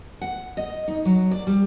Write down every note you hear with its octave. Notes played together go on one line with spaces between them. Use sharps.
F#5
D#5
D#4
F#3
D5
G3